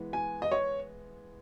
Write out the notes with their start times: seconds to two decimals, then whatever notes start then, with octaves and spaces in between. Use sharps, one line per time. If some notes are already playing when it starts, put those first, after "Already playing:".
Already playing: E3 G#3 B3
0.13 G#5
0.42 D#5
0.52 C#5